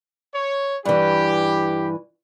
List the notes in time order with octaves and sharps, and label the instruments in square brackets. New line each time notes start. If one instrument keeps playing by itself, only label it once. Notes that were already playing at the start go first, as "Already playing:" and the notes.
[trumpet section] C#5
[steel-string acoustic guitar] G2 E3 [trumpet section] G4